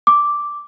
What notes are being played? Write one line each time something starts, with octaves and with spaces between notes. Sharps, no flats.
D6